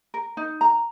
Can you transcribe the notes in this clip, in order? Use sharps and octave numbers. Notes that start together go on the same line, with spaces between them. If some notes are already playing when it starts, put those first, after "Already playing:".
A#4
D#4
A#5